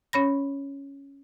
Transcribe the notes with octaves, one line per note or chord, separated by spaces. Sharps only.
C#4 C#5 B5 A#6